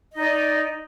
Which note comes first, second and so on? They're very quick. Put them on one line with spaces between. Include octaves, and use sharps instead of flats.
D#5 D#4 D5